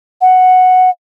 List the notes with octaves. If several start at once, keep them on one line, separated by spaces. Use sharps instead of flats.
F#5